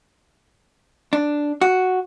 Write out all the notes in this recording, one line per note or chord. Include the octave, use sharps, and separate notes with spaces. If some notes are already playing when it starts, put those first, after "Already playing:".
D4
F#4